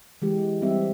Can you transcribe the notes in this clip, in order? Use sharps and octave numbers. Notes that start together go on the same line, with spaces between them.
E3 G#3 G4
G3 C4 G4 E5